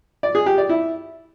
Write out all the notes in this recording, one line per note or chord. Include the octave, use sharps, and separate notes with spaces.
D5
G#4
G4
D5
E4